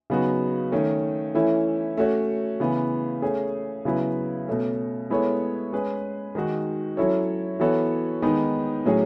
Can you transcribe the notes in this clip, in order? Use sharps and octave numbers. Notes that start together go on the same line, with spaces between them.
C#3 F#3 B3 D#4 F#4
D#3 A3 C#4
E3 A3 C#4 E4
A3 C#4 F#4 C#5
C#3 E3 B3
A3 C#4 G#4
C#3 F#3 B3 E4 B4
B2 A3 C#4
G#3 B3 E4 A4 C#5
G#3 C#4 G#4 B4
D#3 G#3 D#4 F#4
F#3 C#4 E4 A4 C#5
E3 B3 F#4 A4 C#5
D#3 G#3 B3 D#4
A2 F#3 C#4 G#4